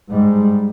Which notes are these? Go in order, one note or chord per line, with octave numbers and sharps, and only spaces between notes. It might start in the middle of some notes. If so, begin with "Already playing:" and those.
G#2 G3